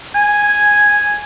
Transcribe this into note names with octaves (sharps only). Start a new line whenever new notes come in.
G#5